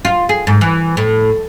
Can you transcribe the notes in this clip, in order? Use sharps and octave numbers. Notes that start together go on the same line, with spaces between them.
F4
G#4
G#2
E3
A2